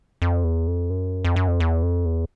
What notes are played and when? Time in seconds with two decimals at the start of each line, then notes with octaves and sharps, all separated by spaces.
0.22 F2
0.44 E2
0.67 F2
0.90 F#2
1.25 F2
1.36 F#2
1.48 F2
1.60 E2
1.83 F2
2.05 E2